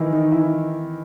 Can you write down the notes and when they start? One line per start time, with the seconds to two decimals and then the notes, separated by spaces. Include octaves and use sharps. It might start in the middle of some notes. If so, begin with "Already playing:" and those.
Already playing: D#3 E3 D#4 E4
0.13 D#3 D#4
0.31 E3 E4